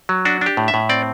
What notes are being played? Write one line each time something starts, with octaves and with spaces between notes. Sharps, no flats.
F#3
D4 F#4
D4 G4
A2
E5
A2
C4 D5